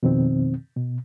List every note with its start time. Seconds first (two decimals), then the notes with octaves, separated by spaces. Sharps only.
0.03 F2 B2 D#3 C4
0.77 B2